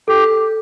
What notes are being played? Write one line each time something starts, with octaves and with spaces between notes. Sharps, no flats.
G4 A4